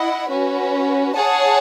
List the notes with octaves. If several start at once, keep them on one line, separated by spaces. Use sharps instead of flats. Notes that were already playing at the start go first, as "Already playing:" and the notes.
Already playing: E4 D#5 F#5
C#4 F#4 B4
G#4 C#5 F#5 A5